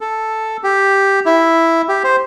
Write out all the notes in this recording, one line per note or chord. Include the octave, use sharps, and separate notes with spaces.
A4
G4
E4
G4
C5